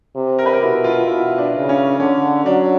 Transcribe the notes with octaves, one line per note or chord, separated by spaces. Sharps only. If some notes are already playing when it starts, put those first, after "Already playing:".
C3
A#4
B4
A#4
B2 E4
F4
B2 E4
D4
C#3
C#4
D3 C#4
F#3 D4